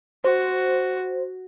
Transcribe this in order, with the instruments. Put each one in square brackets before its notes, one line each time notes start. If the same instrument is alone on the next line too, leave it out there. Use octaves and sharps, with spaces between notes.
[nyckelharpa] F#4 [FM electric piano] C5